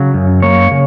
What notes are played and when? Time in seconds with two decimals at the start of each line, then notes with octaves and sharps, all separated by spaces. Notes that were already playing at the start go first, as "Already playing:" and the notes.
Already playing: C#3 F#3
0.14 F#2
0.42 A#3 C#5
0.72 C#3